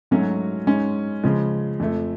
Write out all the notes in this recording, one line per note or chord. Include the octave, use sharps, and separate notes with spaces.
G#2 F#3 A3 C#4 F#4
G#2 G#3 C#4
C#3 F3 G#3
F2 F3 A3